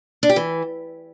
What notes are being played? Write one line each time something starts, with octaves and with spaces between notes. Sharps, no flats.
D4
G4
E3